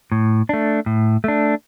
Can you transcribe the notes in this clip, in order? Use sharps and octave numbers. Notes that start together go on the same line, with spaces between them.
A2
A3 D4
A2
A3 D4